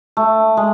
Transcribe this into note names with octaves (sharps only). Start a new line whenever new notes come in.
A3
G#3